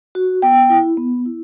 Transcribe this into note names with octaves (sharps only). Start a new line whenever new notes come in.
F#4
B3 G5
E4
B3
E4